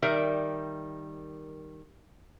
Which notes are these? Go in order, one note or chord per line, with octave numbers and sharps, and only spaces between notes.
D#3 G3 A#4 E5